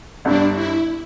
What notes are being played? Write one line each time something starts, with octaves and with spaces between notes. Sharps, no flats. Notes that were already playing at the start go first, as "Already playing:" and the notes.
G1 G2 G3 D4
E4